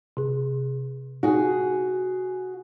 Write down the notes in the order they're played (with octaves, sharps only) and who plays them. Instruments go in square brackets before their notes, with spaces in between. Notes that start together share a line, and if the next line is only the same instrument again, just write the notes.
[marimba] C3 G#4
[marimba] D#4 [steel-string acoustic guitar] F#4 G#4